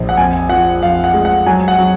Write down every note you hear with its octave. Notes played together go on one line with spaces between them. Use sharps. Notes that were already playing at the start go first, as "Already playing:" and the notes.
Already playing: A#1
F#5
F2 G#5
F3 F#5
F2 F5
F#5
G#3
F#5
F#3 G#5
F#5
F#3